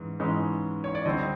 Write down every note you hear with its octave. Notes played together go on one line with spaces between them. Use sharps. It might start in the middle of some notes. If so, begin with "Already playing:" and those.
Already playing: G#2 E3 C#4
G#2 E3 G#3 C#4
C#5
D5
D3 G3 C4 D#5